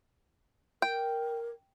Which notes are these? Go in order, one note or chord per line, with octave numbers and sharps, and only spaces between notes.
A#4 G5